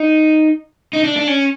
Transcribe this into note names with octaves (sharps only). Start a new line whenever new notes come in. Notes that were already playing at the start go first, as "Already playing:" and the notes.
Already playing: D#4
D#4
D4
D4
C#4